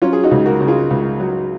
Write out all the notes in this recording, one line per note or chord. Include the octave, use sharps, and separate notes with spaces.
F#3 C#4 F4
G#4
D#4 F#4
C#2
F#4 A#4
C#3
F4 G#4
C#2
F#3